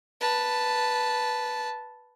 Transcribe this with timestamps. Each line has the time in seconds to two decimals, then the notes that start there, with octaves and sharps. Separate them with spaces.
0.21 B4 A5